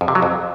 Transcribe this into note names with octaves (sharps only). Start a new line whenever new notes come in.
F2
C3
F#3
F2